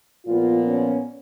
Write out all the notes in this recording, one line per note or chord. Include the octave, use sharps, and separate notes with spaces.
A#2 F3 B3 F4
C#4